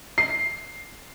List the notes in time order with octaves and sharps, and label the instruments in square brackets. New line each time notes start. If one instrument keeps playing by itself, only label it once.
[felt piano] C7